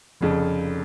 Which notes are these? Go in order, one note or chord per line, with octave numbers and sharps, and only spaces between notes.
F1 F2 C#3